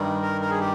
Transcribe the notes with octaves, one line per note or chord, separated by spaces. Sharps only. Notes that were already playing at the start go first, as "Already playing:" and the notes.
Already playing: G2 D#3 G3
A#4
A#4
G#4
G4